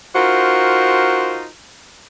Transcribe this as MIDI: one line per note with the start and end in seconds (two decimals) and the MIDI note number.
0.15 1.47 63
0.15 1.47 65
0.15 1.47 66
0.15 1.47 70
0.15 1.47 72